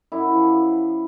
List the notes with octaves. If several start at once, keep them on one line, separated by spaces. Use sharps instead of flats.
F#2 E4
F3